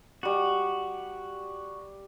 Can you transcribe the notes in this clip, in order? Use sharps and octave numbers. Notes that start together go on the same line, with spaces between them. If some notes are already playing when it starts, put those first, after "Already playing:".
G3 F#4 D#6